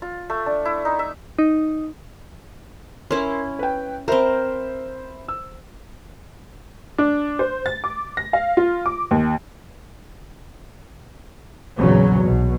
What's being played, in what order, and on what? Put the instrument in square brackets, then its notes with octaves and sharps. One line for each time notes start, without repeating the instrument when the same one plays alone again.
[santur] F4
A3
D4
E4
D#4
E5
[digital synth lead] D#4
[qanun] C#4 E4 [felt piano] A#4 C6
[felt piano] B4 G5
[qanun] C4 A#4 [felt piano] C5 E5 B5
[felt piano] E6
[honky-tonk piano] D4
C5
A6
D6
A#6
F5
F4
D6
D#2
[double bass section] A#1 E2 C#3 F#3
B1 B2